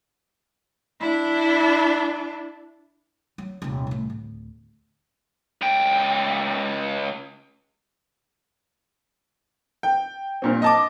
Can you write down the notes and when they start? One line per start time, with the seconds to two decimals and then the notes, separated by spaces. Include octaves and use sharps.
1.01 D4 E4
3.38 F#3
3.62 D#1 C3
3.87 C2 A2
4.10 D1
5.61 C#2 G5
9.83 G5
10.42 G2 A#2 C4
10.62 D#5 A5 D6